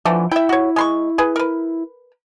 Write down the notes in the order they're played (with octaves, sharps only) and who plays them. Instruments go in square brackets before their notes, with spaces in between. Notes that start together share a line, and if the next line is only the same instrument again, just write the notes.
[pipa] D3 E3 A3 [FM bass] F3
[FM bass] E4 [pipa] E5 G5
[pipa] F#4 C#5
G#3 C6 C#6
G#4 B4
A#4 B4